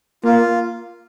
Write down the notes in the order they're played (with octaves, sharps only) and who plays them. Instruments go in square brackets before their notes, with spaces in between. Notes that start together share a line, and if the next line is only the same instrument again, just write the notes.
[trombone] A#3 [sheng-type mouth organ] F4